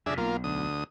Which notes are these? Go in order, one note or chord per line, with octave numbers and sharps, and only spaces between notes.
F2 C3 D4 G#4 E5
B1 A#3 F4
D2 D#6